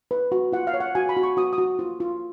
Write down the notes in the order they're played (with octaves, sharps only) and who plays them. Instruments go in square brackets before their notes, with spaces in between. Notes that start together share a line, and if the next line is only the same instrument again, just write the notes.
[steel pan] B4
F#4
F4 F#5
F5
C#5
F#5
F#4 G#5
B5
F#4
C#6
F#4 D#6
D#6
F#4
F4
F4